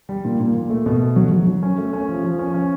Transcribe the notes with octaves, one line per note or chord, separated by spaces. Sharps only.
G3
A#2
A#2
A#2
A3
B2
A3
F#3
F#3
F#3
C#4
A3
C#4
F3
F3
C#4
C#4